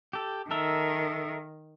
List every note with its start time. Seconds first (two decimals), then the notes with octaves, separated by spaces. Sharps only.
0.13 G4 A4
0.51 D#3 A4 A#4 E5